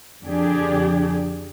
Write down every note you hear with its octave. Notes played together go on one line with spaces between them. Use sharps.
F2 D3 D4 G4 G#4